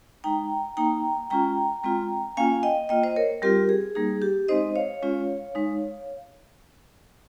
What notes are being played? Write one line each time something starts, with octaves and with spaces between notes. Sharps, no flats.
G#3 D#4 G5 A#5
A#3 D#4 G5 A#5
G#3 C#4 F4 G5 A#5
G#3 C4 F4
A#3 C#4 F4 F5 G#5
D#5 G5
A#3 F4 D#5 G5
C5 D#5
A#4 C#5
G3 C4 F4 G4 A#4
G#4
G3 A#3 D#4 G#4
G4
G#3 C4 D#4 C5 D#5
C#5 F5
G#3 C#4 F4
G#3 D#4